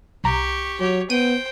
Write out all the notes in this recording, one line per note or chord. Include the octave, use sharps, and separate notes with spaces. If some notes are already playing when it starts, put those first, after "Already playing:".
C2 G4 A#5 C#6
F#3 G4 C#5
B3 C5 G5 D#7